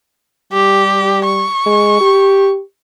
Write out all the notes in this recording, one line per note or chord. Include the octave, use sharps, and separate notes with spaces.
G3 G4
C#6
G#3
G4